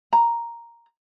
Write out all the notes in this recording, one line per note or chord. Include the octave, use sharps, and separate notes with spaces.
A#5